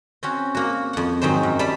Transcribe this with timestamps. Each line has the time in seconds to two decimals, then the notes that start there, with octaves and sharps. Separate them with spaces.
0.23 C4 C#4 F#4
0.55 A#3 F#4
0.93 F2 F#5
1.22 G#2 D#3 F#3 G#3 C5
1.43 F#2
1.59 G3 A5 B5